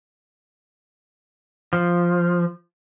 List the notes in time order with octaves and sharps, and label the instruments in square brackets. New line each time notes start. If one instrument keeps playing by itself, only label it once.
[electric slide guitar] F3